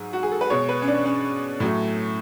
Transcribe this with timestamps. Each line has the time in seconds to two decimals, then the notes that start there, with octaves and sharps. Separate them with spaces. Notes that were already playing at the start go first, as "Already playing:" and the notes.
Already playing: G#2 F#3
0.13 F#4
0.23 G#4
0.32 A4
0.41 B4
0.50 B2 G#3 C#5
0.69 B4
0.82 C#4
0.88 D4
1.06 C#4
1.60 A2 F#3 A3